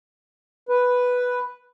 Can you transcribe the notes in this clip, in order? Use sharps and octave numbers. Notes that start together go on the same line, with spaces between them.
B4